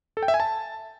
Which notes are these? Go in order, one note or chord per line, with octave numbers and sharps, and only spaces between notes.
A4
G5
E5
G#5
A5